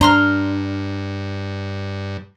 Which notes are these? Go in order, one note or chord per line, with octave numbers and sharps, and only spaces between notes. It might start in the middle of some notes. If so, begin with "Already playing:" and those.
G2 D4 A#5 C6 F6